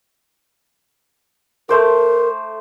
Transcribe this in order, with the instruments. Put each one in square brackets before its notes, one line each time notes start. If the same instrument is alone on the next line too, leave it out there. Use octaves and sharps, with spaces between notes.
[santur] A3 C5 D6 [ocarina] A#4